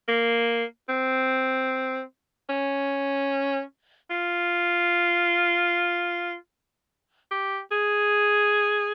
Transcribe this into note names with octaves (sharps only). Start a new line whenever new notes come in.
A#3
C4
C#4
F4
G4
G#4